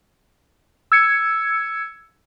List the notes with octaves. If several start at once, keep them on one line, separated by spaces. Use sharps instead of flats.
E6 G#6 C#7